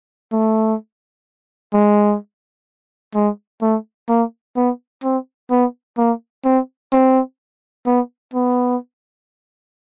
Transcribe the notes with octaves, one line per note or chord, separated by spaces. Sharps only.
A3
G#3
G#3
A3
A#3
B3
C4
B3
A#3
C4
C4
B3
B3